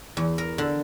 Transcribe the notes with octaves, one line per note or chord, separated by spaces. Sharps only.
E2
A#4
D3